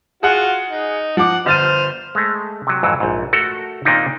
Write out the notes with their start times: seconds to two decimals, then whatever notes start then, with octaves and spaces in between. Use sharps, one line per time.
0.23 F4 F#4 G#4 F#5
0.70 D#4
1.17 F3 F#5 D6
1.46 G1 C5 F6 A6 D#7
2.15 G#3 A3
2.67 C3 F#3
2.83 F2 G#2 E3 F#3
3.00 A#1 G#2
3.33 A3 F#4 A4 A#4
3.85 A#2 D#3 A#3 C4 D4 D#4